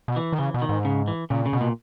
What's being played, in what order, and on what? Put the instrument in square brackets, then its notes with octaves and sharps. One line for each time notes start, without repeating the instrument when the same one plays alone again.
[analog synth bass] B2
[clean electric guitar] E3
[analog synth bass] D#3
[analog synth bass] C#3 [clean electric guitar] E3
[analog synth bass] B2
[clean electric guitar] D#3
[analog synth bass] G#2
[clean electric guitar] C#3
E3
[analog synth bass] A#2 [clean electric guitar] C#3
[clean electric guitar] C#3
[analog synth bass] B2
[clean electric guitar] A#2